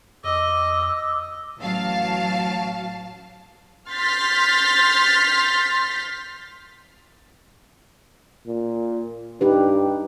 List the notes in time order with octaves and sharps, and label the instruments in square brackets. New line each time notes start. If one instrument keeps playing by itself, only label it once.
[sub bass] F2 [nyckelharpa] D#5 [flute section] D6 E6
[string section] A1 F#3 F5 A5
C6 F6 G6 A6 B6
[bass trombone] A#2
[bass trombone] G2 [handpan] D#4 G4 B4